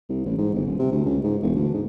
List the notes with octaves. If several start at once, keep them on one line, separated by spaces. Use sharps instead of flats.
C2
A1
G#2
G1
D#1
C3
D2
C#2
G#2
E1
D2
G#2